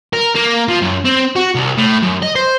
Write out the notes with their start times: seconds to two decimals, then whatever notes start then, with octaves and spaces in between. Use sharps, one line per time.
0.13 A#4
0.36 A#3
0.68 F3
0.82 F#2
1.05 C4
1.36 F#4
1.55 C2
1.77 A2
2.03 F#2
2.23 D#5
2.36 C5